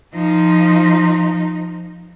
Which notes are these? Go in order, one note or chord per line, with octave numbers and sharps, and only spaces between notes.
F3 D#4